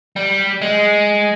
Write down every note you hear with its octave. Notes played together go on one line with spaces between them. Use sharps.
G3
G#3